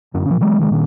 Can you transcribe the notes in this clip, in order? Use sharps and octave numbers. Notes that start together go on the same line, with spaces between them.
F#2 D3 C#4
A#2 F3
E3 F#3 G#3
C3 D#3 F#3 G#3
A#2 D#3 D4